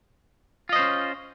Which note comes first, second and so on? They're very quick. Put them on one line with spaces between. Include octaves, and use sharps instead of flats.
F4 D#5 C5 C#4